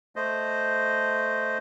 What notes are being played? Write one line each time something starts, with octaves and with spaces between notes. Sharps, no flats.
A3 C5 D#5